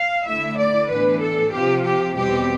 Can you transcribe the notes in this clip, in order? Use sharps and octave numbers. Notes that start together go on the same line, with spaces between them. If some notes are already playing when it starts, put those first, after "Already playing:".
Already playing: F5
D3 A3 E4 E5
D5
A2 E3 B3 D4 B4
A4
C3 F3 C4 F4 G4
G4
E2 B2 G3 C4 G4